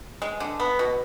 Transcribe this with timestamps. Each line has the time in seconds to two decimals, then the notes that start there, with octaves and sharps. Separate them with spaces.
0.22 G#3
0.40 D3
0.60 B3
0.79 B2